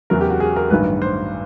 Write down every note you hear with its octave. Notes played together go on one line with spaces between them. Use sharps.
E2 C#3 F#3 A#4
G4
F#4
G#4
A#4
A1 G2 D#3 F#3 B4
C5